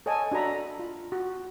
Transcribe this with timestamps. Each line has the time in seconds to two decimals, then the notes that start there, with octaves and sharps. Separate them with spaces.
0.06 A4 C#5 D#5 G#5 A5
0.32 D4 F#4 A4 A#5 B5
0.79 F4
1.12 F#4